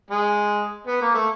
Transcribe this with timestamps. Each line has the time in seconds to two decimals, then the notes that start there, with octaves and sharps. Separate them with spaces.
0.11 G#3
0.87 B3
1.02 A#3
1.14 A3